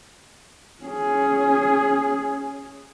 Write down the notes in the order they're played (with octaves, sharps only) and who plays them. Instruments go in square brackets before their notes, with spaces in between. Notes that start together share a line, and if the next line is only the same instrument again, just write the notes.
[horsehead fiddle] C#4 G#4